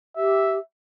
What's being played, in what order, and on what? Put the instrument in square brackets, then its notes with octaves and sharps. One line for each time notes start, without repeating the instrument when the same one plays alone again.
[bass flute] G4 [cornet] E5